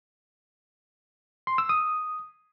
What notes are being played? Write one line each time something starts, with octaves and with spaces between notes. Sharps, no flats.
C6
E6
D#6